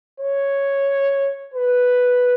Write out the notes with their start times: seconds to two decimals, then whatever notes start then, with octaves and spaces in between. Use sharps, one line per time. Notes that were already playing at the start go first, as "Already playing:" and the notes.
0.20 C#5
1.54 B4